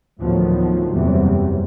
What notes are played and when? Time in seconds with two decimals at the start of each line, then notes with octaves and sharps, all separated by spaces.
0.21 D2 A2 D#3 F3 F#3 B3
0.95 F#1 E2 C3 F#3 G3 C4